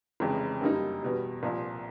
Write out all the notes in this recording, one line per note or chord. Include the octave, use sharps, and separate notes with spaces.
F1 F2 C#3 E3 G#3
F#2 D3 G3 A#3 D#4
E2 B2 G3
C2 A#2 F3